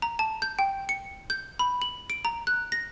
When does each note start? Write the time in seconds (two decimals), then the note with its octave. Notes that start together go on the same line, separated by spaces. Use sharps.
0.02 A#5
0.19 A5
0.42 G6
0.59 G5
0.89 C#7
1.30 G6
1.59 B5
1.82 F#7
2.10 D7
2.25 A#5
2.47 F#6
2.72 A#6